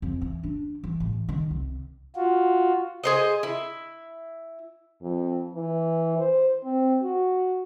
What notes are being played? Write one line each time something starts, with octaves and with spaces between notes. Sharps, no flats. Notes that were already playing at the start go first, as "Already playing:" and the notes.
F2
E3
D4
E3
A1
D#3
C2
F4 F#4
G#4 C5 D#5
E4
F2
E3
C5
C4
F#4